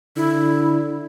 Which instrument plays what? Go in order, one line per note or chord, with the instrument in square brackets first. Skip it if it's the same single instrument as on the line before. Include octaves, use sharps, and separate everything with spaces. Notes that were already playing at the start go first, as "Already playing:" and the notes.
[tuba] D3 [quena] E4